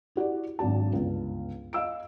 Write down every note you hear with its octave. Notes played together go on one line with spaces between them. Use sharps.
E4 F#4 G4 D5
G#1 F#3 D4 F#4 A5
G1 C#2
D#5 F5 E6 D7